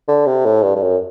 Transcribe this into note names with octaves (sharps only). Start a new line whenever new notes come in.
D3
C3
A2
G2
G2
F#2